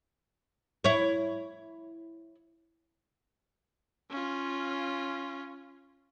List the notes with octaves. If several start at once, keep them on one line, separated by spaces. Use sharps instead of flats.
E4 C#5
C#4 F4